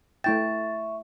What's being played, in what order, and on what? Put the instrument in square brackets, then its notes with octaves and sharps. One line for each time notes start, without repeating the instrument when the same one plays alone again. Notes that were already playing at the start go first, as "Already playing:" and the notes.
[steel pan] A3 E4 G5 [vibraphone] E5 C#6 [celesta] A6